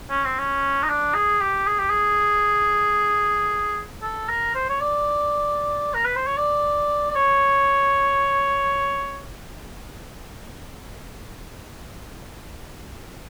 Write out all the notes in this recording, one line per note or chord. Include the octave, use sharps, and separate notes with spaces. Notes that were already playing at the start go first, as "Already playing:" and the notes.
C#4
C4
C#4
D#4
D4
G#4
G4
G#4
G4
G#4
A4
A#4
C5
C#5
D5
A#4
B4
C5
C#5
D5
D5
C#5